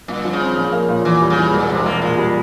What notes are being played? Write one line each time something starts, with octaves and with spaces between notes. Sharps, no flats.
G1 A#2
F3
C#3
C4
A#1
A#3
A#2
E2 E3
G3
C#3
E3
E1 A#2
E1 C3
E1 A#3
A#2 G#3
G3